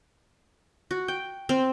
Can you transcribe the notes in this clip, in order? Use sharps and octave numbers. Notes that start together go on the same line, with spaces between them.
F#4
G5
C4